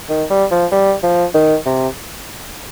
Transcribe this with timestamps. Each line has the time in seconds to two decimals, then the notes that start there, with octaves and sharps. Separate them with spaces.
0.09 D#3
0.30 G3
0.51 F3
0.72 G3
1.03 F3
1.34 D#3
1.66 C3